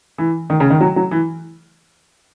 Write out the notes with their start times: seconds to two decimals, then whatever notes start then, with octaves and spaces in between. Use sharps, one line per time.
0.18 E3
0.50 D#3
0.60 C#3
0.70 D#3
0.81 F#3
0.96 F#3
1.11 E3